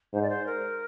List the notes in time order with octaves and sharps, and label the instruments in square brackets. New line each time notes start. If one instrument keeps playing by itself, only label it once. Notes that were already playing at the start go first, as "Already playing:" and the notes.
[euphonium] G#2 [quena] C5
[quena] D5
C5
A#4